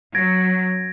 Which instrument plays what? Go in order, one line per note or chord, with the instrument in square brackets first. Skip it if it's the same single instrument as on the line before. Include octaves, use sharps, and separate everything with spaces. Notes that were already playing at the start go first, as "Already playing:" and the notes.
[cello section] F#3 [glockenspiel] G#6 A#6 D7